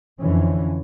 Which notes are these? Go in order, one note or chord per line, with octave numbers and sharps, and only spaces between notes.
F2 D3 E3 C#4